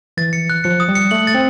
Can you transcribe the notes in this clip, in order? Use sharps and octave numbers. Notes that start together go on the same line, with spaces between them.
E3 A6
C#7
F#6
F3 C#7
D#6
G3
C#7
A3 F#7
A6
C4